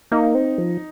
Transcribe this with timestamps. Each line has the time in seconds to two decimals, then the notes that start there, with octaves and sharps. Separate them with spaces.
0.12 A#3 D#4
0.35 C4
0.58 F3